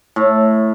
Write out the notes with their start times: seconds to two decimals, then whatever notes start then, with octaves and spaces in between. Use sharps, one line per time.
0.16 A2